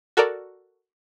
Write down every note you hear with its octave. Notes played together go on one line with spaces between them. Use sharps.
F#4 A4 A#4 D5